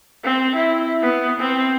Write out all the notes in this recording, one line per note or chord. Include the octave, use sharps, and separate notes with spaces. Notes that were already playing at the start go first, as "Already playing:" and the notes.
C4
E4
B3
C4